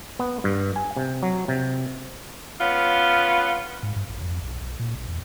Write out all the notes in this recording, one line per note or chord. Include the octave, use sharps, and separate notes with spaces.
B3
G2
G#5
C3
F#3
C3
B3 C#4 F4
G#2
G2
A1
F2
B1
B1
A#2
A#1
E2